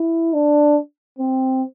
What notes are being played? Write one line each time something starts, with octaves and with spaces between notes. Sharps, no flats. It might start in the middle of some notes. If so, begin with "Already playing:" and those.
Already playing: E4
D4
C4